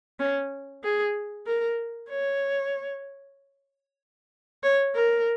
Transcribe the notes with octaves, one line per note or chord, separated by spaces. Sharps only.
C#4
G#4
A#4
C#5
C#5
A#4